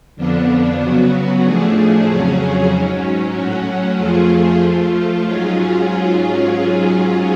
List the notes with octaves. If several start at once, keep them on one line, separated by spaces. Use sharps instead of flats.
F2 D3 F3 B3 D4
C#3 F#3 B3 F#4
A2 F3 A3 D4 G#4
F2 C#3 F#3 C#4 G#4
G#2 F#3 C#4
A2 F#3 C#4 F#4
F2 F3 A3 F4 G#4
F3 A3 F4
G#2 F#3 C#4 F4 G#4